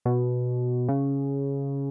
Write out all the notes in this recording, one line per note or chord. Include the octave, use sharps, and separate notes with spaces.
B2
C#3